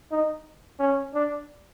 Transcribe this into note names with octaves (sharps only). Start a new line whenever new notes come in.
D#4
C#4
D4